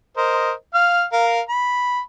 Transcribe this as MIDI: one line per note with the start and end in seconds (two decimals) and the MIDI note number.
0.17 0.52 70
0.17 0.52 72
0.17 0.52 75
0.74 1.04 77
0.74 1.04 89
1.13 1.41 70
1.13 1.41 77
1.49 2.00 83